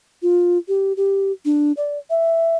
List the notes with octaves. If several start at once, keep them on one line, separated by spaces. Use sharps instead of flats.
F4
G4
G4
D4
D5
E5